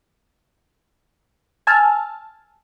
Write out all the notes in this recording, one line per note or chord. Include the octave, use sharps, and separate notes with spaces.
G#5 A5 E6 F6